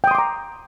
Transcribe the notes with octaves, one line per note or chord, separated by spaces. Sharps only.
G5 A#5 C6 D6 D#6